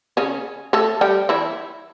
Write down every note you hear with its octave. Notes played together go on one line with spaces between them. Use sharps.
C#3 C#4
A3 A4
G3 G4
E3 E4